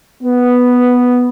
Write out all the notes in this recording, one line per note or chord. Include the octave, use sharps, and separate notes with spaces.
B3